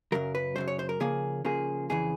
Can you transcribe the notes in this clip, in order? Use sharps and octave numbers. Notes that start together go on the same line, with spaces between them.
F#2 C#3 F#3 A#4
B4
F#2 C#3 F#3 C5
C#5
C5
A#4
C#3 F3 A#3 G#4
C#3 F3 A#3 G#4
F2 C#3 E3 G#4